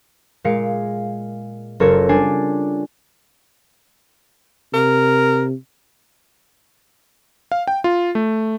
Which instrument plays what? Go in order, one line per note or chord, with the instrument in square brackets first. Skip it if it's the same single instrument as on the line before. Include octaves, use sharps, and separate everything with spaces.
[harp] A#2 G#3 F5 C#7 D7
F#1 F#3 F4 A4 A#4 C#5
G3 D4 G#5 A6 C7
[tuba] C3 [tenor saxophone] A#4
[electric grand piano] F5
G5
F4
A3